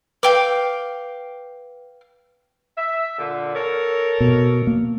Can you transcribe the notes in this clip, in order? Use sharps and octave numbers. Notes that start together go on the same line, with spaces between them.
B4 F5 G5 D6
E5
A#2 D3
A4 A#4 C#5
B2
A#3